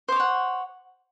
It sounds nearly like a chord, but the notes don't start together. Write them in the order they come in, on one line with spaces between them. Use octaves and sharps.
C5 D6 C#5 F#5